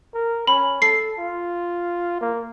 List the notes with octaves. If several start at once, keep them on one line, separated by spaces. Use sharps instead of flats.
A#4
C#4 B5
A4 C7
F4
A#3